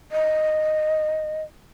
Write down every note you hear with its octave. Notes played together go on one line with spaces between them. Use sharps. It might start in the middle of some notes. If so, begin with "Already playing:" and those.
D#5